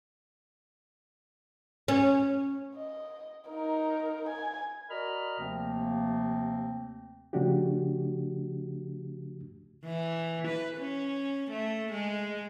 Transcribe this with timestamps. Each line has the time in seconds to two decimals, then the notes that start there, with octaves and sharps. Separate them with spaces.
1.88 C#4
2.75 D#5
3.49 D#4 A#4
4.29 G#5
4.89 F#4 A#4 D5 D#5 B5 F6
5.39 D#2 C3 F3 A3 A#3 C4
7.33 C#3 F3 A3 D4 F#4 G4
9.86 E3
10.48 B4
10.78 C#4
11.51 A3
11.92 G#3